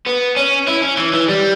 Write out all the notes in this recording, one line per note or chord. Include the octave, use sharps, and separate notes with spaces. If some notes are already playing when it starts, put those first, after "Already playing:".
B3
C#4
E4
C#4
E3
E3
G3